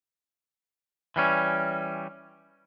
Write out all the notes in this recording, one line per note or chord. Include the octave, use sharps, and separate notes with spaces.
E3 G3 C#4